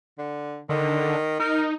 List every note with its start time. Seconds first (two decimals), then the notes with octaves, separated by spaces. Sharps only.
0.18 D3
0.69 D3 D#3
1.40 D#4 A#4